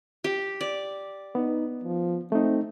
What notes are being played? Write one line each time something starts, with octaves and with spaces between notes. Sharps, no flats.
G4
D5
B3 D#4
F3
A3 C4 D#4